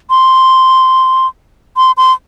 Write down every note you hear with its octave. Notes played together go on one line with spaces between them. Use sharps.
C6
C6
C6